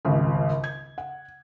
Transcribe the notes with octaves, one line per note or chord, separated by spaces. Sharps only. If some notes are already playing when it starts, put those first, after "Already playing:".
D#1 G#1 C#2 C#3
G#6
F#5